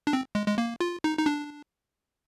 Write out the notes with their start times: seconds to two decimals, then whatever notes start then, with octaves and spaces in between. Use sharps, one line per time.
0.07 D4
0.13 C4
0.35 G#3
0.47 G#3
0.58 A#3
0.81 F4
1.04 D#4
1.18 D#4
1.26 D4